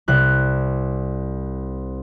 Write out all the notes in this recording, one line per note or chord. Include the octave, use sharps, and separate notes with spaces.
C2 F#6